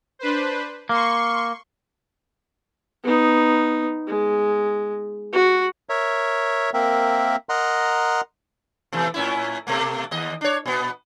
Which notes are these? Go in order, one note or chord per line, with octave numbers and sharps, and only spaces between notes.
D4 B4 C5
A#3 C6 C#6
B3 D#4
G#3
F#4
A#4 C#5 E5
A#3 C4 A#4 E5
A#4 D#5 F#5 A#5 C6
B2 E3 A3
A2 C#4 E4
B2 A3 A#3
D#2 D#5
D4 C#5
A#2 B3